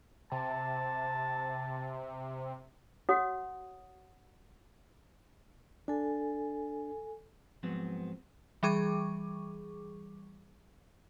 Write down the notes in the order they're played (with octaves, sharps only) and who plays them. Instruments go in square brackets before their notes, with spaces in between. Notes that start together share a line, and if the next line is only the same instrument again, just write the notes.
[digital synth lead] C3 [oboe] A5
[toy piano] F#4 C#5 F#5 D#6
[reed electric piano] D4 [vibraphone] A4 G#5
[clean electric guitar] G#2 F3 F#3 B3 C4
[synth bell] E3 G3 G#4 C#6 D6